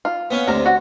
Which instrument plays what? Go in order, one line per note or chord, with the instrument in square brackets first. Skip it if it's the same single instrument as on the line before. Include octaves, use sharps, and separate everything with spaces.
[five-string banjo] F4
[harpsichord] B3 C#4 F5
[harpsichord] D2 C3 [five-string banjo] A#4
[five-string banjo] F#4